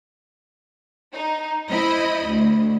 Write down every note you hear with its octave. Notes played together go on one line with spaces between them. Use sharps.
D#4
E4 C5 D#5 B5
D2